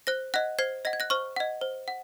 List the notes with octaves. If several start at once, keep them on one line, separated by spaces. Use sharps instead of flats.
C5 F#6 A#6
D#5 F#5 F#6 A#6
C5 G#6 C7
D#5 F#5 A#6
G#6
F#6 A#6
C5 C#6 F6
D#5 F#5
C5
F#5